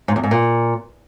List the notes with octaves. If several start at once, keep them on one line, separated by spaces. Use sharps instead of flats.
G#2
E2
G#2
A#2